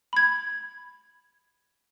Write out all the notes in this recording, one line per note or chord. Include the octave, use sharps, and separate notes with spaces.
B5 G#6